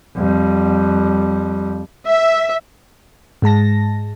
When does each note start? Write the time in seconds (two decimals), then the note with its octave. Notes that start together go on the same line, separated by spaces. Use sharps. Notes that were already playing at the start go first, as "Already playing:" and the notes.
0.17 F2 G3
2.07 E5
3.42 G#2 G#3 A5 A#6